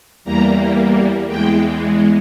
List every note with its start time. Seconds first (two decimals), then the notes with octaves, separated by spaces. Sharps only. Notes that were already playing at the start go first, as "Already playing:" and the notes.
0.24 E2 E3 G3 A#3 A#5
1.27 E2 E3 G#3 G5